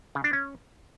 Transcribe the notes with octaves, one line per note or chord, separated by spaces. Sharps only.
C#3
D4
C#4